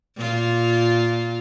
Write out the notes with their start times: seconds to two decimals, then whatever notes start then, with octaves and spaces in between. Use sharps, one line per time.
0.16 A#2 F4